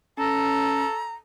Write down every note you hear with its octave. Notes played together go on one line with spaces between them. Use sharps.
C#4 A4 A#5